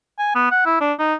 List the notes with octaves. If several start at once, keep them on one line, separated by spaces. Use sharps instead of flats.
G#5
B3
F#5
E4
D4
D#4